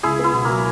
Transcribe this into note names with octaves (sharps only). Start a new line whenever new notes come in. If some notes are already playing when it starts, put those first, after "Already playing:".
C#2 E4 G#4
B3 E4
B2
F#3 A#3